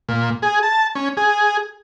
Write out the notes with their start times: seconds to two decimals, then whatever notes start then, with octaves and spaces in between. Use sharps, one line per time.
0.09 A#2
0.42 G#4
0.63 A5
0.95 C#4
1.17 G#4